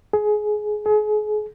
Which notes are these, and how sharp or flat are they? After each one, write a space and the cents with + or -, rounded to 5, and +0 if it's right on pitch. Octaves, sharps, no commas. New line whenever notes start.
G#4 +20
G#4 +35